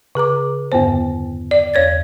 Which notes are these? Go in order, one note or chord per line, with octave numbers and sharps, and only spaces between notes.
C#3 G#4 A#5 D6
E2 G2 D3 B3 C5
D5
E2 C#5 G#6 A6